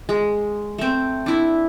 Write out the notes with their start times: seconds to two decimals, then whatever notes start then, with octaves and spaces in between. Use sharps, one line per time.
0.09 G#3
0.78 A3 C4
1.26 D4 E4